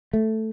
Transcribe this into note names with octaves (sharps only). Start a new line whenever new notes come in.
A3